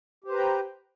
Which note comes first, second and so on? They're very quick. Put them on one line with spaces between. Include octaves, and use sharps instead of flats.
G4 C5 B4 A#5 G5